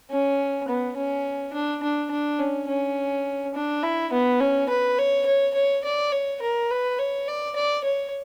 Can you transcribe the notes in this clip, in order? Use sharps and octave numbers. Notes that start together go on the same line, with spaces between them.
C#4
B3
C#4
D4
D4
D4
C#4
C#4
D4
E4
B3
C#4
B4
C#5
C#5
C#5
D5
C#5
A#4
B4
C#5
D5
D5
C#5